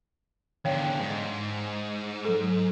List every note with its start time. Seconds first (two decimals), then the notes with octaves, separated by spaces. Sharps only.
0.65 E2 D3 C#5 F5 G5
0.99 G#2
2.25 F#3 A4